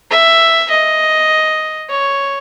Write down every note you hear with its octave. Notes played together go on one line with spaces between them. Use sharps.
E5
D#5
C#5